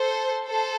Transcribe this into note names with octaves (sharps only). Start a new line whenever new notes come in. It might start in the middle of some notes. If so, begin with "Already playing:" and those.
Already playing: A4 C5
A4 C5